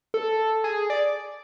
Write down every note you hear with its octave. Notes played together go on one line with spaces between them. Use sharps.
A4
G#4
D5